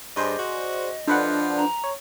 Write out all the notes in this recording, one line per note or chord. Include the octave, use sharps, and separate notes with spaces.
G2 G#4 C5 D5 D#5
F#4
F3 D4 A4 B4 F#5
A#5
C#5